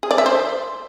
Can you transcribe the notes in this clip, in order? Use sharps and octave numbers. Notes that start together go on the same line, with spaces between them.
G#4
D5
E5
C5